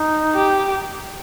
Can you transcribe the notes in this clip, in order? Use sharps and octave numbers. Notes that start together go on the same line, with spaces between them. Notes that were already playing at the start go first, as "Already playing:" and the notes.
Already playing: D#4
G4